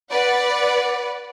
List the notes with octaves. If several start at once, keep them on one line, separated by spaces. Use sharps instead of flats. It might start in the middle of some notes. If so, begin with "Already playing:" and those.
B4 D5 F#5